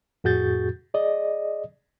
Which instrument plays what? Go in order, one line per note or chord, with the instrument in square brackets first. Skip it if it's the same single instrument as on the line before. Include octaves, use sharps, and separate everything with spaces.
[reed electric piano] F2 A2 F#4 G#4 G6 A6
G#4 D5 D#5